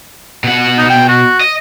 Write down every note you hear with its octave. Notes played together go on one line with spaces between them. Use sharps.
B2 F#5
D#4
G5
F#4
D#5